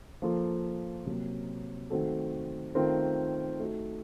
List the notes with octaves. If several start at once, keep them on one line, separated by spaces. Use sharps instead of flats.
F3 A#3 F4 A4
C3 F#3 A#3
D#3 A3 C4 F#4 A4
D#3 A3 C4 F4 A#4
A3 D#4 F#4